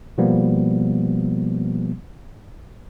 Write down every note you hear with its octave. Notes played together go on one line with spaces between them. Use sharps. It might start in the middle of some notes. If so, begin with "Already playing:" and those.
B2 F3 G3 A#3 B3